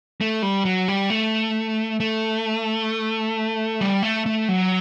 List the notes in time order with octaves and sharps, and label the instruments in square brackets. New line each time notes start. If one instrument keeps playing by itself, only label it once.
[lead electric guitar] A3
G3
F#3
G3
A3
A3
G3
A3
A3
F#3